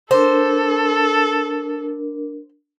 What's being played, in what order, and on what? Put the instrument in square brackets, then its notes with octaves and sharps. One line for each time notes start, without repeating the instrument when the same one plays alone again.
[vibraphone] D4 A#4 [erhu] A4 [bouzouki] C5